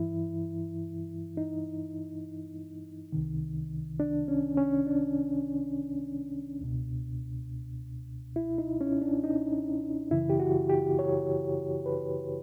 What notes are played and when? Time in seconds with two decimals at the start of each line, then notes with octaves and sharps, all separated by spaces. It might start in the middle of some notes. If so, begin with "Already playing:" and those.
Already playing: G2 E3 E4
1.37 D#4
3.12 C2 C3 D#3
4.00 D4
4.28 C#4
4.58 C#4
4.87 D4
6.61 C#2 B2
8.36 E4
8.58 D#4
8.81 C#4
9.02 D4
9.24 D#4
10.11 F#2 C#3 E3 E4
10.30 G4
10.40 F#4
10.70 G4
10.99 C#5
11.86 B4